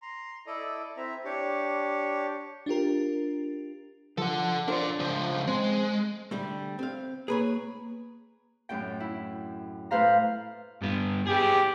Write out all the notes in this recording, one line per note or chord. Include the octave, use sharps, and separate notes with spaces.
A#5 C6
E4 A4 D5 D#5
C4 E4 E5 A#5
D4 G4 C#5
D4 F4 G4 A#4
F3 A4 F#5
D4 F4 A#4 C5 D5
C#2 F3
G#3 C4
D3 G3 A3
C4 F5
A#3 G#4 B4 C#5
F#2 A2 G5
E4
A2 B4 C5 F5 A#5
G2 B3
B3 G4 G#4